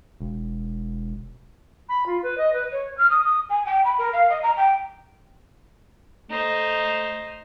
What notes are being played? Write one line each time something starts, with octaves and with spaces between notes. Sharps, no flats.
E1
B5
F4
B4
D#5
B4
C#5
F6
D#6
D#6
G#5
G5
B5
A#4
F5
D#5
A#5
G5
A3 D#4 C5